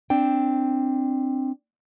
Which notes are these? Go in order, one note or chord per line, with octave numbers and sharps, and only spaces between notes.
C4 D4 G5